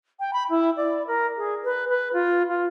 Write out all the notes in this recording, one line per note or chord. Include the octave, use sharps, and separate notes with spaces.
G5
B5
E4
D5
A#4
G#4
B4
B4
F4
F4